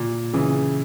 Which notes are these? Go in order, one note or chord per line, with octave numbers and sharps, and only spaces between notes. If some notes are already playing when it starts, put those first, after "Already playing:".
Already playing: A#2
C#3 E3